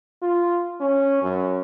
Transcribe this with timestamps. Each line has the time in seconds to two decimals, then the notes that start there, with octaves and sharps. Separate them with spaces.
0.22 F4
0.80 C#4
1.22 F#2